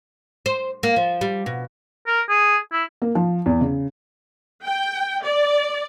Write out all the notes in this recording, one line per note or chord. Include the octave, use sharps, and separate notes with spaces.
C5
A#3
F3
G3
B2
A#4
G#4
E4
A#3
F3
E2
C#3
G5
D5